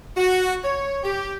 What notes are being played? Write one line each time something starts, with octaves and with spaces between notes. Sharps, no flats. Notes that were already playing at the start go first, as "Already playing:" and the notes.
F#4
C#5
G4